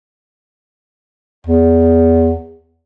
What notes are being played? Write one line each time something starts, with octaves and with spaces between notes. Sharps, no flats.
E2